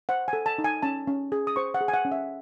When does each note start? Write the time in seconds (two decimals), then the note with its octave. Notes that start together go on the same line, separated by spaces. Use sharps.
0.09 C5 F#5
0.28 G#5
0.33 A4
0.46 A5
0.58 D#4
0.64 G#5
0.82 C#4 A5
1.08 C#4
1.32 G#4
1.47 D#6
1.56 C5 C#6
1.74 F#5
1.81 G#4
1.88 G#5
1.94 F#5
2.05 C#4
2.12 E5